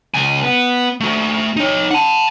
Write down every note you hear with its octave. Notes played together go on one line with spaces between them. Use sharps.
C#2 G#5
B3
A3 F#4
D#4 C#5
F#5 A5